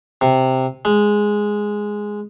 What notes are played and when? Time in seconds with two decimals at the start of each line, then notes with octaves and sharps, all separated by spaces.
0.21 C3
0.85 G#3